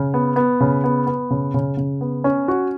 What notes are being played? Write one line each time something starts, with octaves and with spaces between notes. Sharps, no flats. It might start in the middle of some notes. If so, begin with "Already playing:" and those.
Already playing: C#3
B3
B3
C#3
B3
B3
C#3
C#3
C#3
B3
C#4
F#4